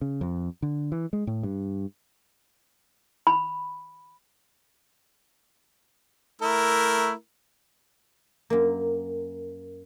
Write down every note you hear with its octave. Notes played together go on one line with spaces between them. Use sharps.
C#3
F2
D3
E3
G#3
A2
G2
B5
A3 E4 A#4
F#2 A#3